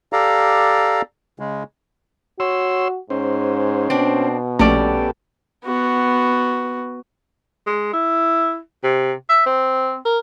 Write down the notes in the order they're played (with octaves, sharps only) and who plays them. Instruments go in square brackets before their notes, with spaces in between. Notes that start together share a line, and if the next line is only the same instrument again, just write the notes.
[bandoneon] G4 A4 D5 F5 A#5
C#3 G#3
[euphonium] F#4 [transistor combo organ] C#5 C6 E6
[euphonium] G#2 [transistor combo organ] C#4 C5
[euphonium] B2 [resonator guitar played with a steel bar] C4 D4
[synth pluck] A#1 A3 A5 [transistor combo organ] B3 G4 A4 [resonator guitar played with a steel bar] C#4 D5
[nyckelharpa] B3 F#4
[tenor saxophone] G#3
E4
C3
E5
C4
A#4